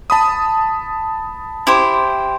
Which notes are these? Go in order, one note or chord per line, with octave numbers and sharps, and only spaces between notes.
A5 B5 D#6
E4 G4 C5